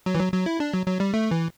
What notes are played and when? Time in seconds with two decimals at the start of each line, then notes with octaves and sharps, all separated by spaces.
0.06 F#3
0.15 E3
0.20 F#3
0.33 F#3
0.46 E4
0.60 D4
0.74 F#3
0.86 F#3
1.00 G3
1.14 A3
1.31 E3